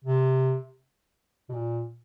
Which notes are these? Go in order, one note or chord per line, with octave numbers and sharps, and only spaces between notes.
C3
B2
A#2